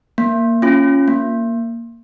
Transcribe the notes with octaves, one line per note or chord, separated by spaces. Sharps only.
A#3
C#4 F4
A#3